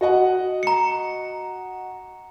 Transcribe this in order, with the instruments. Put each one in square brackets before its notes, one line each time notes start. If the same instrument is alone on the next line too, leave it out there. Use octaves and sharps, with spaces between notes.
[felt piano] F#4 D#5 F#5
[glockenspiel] A#5 C#7